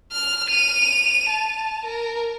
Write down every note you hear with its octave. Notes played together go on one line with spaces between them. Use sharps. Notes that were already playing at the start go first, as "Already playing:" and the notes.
F6
D#7 F7
A5
A#4